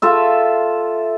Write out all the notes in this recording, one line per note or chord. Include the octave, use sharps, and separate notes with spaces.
F4 A4 E5